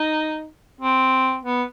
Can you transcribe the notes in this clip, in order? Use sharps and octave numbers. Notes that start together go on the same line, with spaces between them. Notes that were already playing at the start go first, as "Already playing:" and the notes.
Already playing: D#4
C4
B3